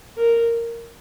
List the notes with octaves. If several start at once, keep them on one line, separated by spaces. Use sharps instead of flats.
A#4